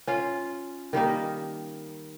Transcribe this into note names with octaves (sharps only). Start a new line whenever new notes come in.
C#4 F4
D#3 G3 A#3 D#4